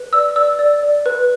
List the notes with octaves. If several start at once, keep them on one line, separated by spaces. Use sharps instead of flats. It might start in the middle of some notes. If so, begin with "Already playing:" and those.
Already playing: B4
D5 E6
D5 E6
D5
D5
B4